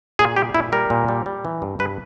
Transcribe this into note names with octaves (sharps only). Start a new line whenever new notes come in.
A#2 G#4
G3 G4
A#2 E4
G3 A#4
A#2
G3
G3
E3
G2
G2 B4